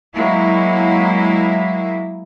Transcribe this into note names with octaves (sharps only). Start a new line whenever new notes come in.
F#3 G#3 A#3 E4